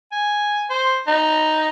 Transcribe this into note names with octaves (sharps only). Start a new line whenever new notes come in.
G#5
C5
D#4